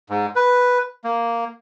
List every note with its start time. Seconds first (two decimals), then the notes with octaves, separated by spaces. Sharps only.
0.10 G#2
0.36 B4
1.04 A#3